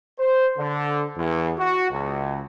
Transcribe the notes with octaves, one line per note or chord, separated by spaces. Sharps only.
C5
D3
E2
F#4
C#2